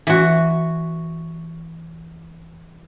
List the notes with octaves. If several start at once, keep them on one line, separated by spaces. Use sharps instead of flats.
E3 F#4